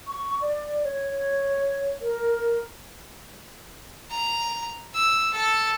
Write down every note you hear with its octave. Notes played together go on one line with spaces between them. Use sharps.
C#6
D5
C#5
A#4
A#5
E6
A4